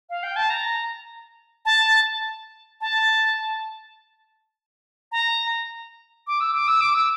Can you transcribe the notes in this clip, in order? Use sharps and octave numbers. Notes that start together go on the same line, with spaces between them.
F5
G5
A5
A#5
A5
A5
A#5
D6
E6
D6
E6
D6
E6